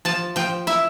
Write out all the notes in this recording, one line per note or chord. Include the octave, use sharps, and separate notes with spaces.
F3 A5
F3 G5
E4 E5